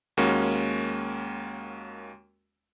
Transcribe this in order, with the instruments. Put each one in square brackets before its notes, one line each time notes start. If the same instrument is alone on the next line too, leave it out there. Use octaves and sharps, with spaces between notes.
[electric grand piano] D#2 G#3 A#3 C#4 F#4